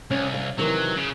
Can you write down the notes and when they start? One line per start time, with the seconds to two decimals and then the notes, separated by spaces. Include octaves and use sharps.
0.11 C2 C#4
0.34 F5
0.58 C3 D#3 E3 F#3
0.97 C#3